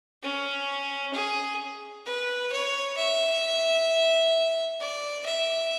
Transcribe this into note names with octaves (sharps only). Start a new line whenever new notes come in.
C#4
G#4
B4
C#5
E5
D5
E5